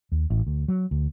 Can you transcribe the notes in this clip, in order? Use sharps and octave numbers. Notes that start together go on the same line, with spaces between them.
D#2
A1
D2
F#3
D2